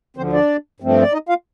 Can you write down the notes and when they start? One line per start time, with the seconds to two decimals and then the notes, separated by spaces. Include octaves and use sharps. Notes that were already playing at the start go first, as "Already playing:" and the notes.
0.17 D2 D3 F3 C4 C5
0.33 D4 D5
0.80 G2 F3 A3 C4
1.02 D5
1.12 D#4 D#5
1.29 F4 F5